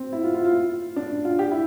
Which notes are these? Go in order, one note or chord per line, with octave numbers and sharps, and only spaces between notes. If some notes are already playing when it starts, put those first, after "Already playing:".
Already playing: C4
E4
F4
F4
F4
D4
F4
G4
E4